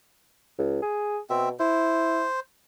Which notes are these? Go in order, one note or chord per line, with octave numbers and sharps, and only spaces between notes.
C#2
G#4
B2 C4 E5
E4 C5